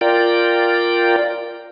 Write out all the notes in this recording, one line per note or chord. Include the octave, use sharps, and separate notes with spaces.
F4 A#4 D5 G5